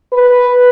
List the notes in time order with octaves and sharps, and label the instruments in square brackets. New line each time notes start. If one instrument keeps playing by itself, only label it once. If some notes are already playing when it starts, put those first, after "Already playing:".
[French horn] B4